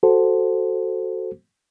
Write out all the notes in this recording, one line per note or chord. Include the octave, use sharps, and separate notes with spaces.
F#4 A4 C5